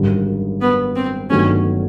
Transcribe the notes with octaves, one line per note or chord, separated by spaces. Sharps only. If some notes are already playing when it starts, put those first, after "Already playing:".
Already playing: G#1 F#2 D3 G3
B3
C4
G1 G2 D#3 F#3 A3 C#4